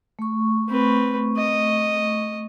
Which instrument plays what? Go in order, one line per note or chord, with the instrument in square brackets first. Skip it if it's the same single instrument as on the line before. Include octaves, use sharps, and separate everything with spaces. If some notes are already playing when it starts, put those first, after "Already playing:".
[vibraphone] A3 C#6
[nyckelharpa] C4 B4
D#5